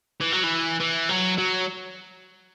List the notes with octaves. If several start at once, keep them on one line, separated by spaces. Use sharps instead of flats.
E3
F#3
E3
E3
F#3
F#3